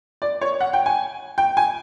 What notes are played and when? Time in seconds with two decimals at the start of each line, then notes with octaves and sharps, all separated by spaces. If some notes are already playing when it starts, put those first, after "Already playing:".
0.22 D5
0.41 C#5
0.61 F#5
0.73 G5
0.86 G#5
1.38 G5
1.57 G#5